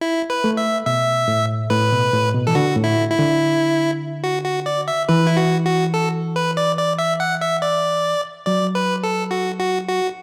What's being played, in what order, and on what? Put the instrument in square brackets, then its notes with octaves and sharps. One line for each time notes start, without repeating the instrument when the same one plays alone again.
[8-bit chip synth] E4
B4
[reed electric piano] A3
[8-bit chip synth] E5
[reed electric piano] B2 [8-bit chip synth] E5
[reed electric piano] A2
[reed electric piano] A2 [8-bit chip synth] B4
[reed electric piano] B2
A2
B2
[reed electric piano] E3 [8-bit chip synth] A4
[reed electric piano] D3 [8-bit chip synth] F#4
[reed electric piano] A2
[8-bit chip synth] E4
E4
[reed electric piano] D3
[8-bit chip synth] F#4
F#4
D5
E5
[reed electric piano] E3 [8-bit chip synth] B4
[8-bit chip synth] E4
F#4
F#4
A4
B4
D5
D5
E5
F#5
E5
D5
[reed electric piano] F#3 [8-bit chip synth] D5
[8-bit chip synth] B4
A4
F#4
F#4
F#4